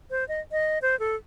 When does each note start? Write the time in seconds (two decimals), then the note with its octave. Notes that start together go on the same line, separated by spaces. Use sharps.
0.11 C5
0.28 D#5
0.52 D#5
0.82 C5
0.99 A4